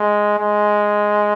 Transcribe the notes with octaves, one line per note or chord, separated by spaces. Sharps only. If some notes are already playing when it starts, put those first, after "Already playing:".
Already playing: G#3
G#3